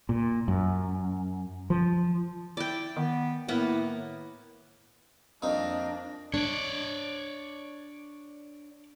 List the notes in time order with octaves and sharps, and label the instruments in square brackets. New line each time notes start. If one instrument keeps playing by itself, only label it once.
[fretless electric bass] A#2
F#2
F3
[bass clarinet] E4 [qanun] D5 G5
[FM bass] D#3 [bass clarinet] B3
[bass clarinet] A2 [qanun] A#3 B3 [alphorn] E4
[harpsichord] F2 A#2 D#4 [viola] D4 [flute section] D#5
[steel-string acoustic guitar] D4 [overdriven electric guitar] C#5 D5